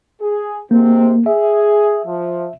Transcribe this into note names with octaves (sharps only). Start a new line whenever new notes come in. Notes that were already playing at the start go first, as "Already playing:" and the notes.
G#4
G#2 C3 A#3 C4
G#4 E5
F3